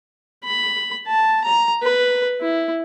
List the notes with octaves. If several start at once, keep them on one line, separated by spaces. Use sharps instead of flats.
B5
A5
A#5
B4
E4